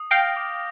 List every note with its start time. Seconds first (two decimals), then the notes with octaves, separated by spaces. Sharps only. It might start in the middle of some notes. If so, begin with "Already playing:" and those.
Already playing: D#6
0.11 F5 G5 A#6
0.36 D6